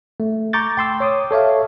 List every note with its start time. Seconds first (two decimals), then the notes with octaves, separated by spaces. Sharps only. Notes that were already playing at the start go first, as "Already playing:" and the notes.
0.20 A3
0.53 A#5 C#6 D6 G6 A6
0.77 G5 C6 E6
1.00 C#5 D6 D#6
1.31 A4 C#5 E5 F5